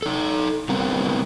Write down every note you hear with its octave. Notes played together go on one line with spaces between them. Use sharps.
D#4 A4
D3 G3 B3 C4 A#4